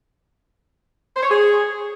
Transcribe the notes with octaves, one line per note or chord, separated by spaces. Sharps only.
C5
C#5
G#4